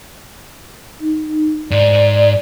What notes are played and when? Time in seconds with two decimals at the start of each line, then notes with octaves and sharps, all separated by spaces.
1.00 D#4
1.71 G#2 D5